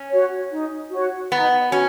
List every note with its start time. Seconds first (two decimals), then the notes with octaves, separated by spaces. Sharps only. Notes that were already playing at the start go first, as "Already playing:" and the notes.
Already playing: C#4
0.10 F#4 C#5
0.50 D#4
0.91 F#4 C#5
1.32 B3 D#4
1.72 C#4 F#4